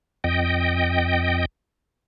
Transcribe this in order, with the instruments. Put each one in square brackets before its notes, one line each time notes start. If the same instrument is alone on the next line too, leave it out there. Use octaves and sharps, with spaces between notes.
[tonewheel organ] F2 D#5 G5